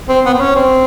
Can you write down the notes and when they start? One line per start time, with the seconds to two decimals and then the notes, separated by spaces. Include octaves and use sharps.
0.09 C4
0.26 B3
0.33 C4
0.40 C#4
0.56 C4